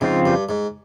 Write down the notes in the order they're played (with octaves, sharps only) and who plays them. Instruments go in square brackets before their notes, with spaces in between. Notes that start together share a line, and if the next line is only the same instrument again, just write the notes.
[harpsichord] G#2 [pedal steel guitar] C#3 F3 C4 F4
[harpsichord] G2
G#2